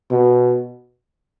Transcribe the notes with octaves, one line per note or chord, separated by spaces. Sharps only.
B2